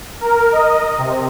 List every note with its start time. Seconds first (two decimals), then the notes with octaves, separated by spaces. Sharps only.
0.21 A#4
0.52 D#5
0.98 C3